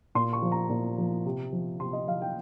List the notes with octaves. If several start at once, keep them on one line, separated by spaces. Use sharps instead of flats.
A#2 C6
C#6
F3
A#5
A#2
F3
C3
F3
C3 C6
D#5
F3 F5
G5